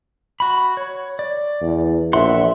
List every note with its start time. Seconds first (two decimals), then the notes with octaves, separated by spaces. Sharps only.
0.40 F#4 B5
0.77 C#5
1.19 D5
1.61 E2
2.13 A#1 E5 F#5 C6